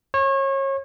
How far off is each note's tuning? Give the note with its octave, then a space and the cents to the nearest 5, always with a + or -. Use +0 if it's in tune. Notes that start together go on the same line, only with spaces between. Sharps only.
C#5 -30